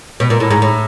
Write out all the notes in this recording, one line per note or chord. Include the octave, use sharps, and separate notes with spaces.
B2
A#2
A2
G#2
A2